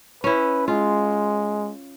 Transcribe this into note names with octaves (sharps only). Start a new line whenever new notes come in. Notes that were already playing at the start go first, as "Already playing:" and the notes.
C#4 E4 B4
G#3 F4